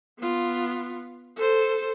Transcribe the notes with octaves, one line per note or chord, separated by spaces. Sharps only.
B3 F4
A4 C5